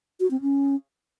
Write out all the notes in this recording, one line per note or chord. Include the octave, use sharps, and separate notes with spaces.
F#4
C4
C#4